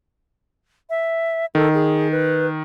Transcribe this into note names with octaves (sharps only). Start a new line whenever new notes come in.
E5
D#3 A4
G#4
B4